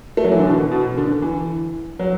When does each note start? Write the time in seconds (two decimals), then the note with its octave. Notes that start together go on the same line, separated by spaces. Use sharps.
0.17 A3
0.24 F#3
0.32 E3
0.39 D3
0.46 B2
0.71 B2
0.97 D3
1.22 E3
2.00 F#3